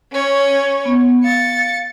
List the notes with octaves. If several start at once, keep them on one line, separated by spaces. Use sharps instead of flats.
C#4 C#5
B3
F5 A6 C#7